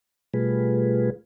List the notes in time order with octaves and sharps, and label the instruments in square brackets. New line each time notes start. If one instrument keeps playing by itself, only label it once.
[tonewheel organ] B2 G3 A3 F4 G#4 B4